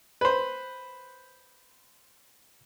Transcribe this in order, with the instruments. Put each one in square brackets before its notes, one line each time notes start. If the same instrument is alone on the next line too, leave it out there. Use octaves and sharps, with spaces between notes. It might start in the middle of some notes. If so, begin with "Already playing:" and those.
[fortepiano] B4 C5